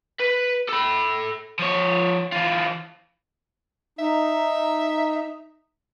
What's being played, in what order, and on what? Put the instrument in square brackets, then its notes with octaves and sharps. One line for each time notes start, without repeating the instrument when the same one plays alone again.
[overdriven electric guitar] B4
A4 B5
F3 C#5
E3 F4
[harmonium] D#4 [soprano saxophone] E5